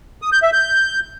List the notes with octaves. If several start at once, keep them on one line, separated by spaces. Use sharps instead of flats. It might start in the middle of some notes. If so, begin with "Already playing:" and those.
D#6
G6
E5
G6